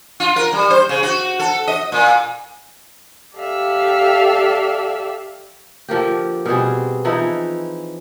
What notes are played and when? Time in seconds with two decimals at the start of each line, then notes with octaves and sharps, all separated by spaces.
0.20 F4
0.36 A#4
0.53 G3
0.70 C5
0.89 C#3
1.03 F#4
1.39 A4
1.67 D#5
1.92 A#2
3.36 G4 A4 D5 E5 F5
5.88 D3 F3 A#3 G4
6.45 B2 G3 C4 G#4
7.05 E3 F3 D#4 E4